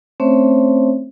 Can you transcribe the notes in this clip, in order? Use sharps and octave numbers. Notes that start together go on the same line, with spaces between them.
A3 C4 C#4 C5 C#5 E5